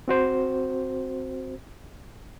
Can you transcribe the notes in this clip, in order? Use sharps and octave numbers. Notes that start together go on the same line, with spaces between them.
C4 F#4 C5